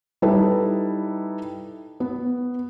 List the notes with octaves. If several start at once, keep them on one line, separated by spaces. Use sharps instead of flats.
G3 D#4 E4 A4 B4 A5
B3